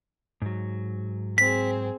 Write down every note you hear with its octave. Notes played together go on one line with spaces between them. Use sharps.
G#2 F#3
C4 G#4 B6